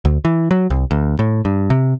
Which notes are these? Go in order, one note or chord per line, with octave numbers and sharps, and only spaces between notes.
D2
E3
F#3
C2
D2
A2
G2
C3